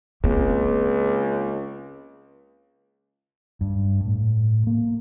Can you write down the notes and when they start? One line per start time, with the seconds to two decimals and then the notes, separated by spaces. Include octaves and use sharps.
0.24 C#2 A#3 C4
3.61 G2
4.06 A2
4.67 A#3